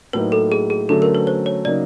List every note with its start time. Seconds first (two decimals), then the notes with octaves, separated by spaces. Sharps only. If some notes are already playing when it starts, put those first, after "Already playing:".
0.13 A2 F#3 A#3 D#4 B4
0.32 A4
0.52 G#4
0.70 G#4
0.89 D3 F#3 A3 C#4 A4
1.02 A#4
1.15 B4
1.27 C5
1.46 C#5
1.65 C#3 F#3 A#3 D#4 D5